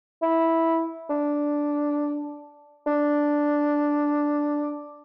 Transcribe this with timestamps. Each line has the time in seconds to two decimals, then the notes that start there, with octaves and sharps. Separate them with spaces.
0.22 E4
1.10 D4
2.87 D4